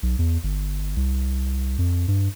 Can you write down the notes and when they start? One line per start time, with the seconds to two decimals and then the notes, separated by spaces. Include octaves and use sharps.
0.03 B1
0.19 E2
0.43 G1
0.96 C2
1.78 F2
2.08 G2